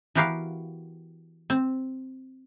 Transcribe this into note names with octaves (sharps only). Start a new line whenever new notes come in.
E3 B3 F#4 G4 A#4 F5
C4